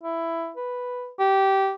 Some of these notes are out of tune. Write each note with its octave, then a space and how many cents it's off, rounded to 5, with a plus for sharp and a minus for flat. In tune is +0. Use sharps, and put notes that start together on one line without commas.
E4 +10
B4 +0
G4 -15